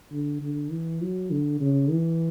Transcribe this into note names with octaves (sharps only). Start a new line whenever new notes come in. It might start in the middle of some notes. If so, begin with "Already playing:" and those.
D3
D3
E3
F#3
D3
C#3
E3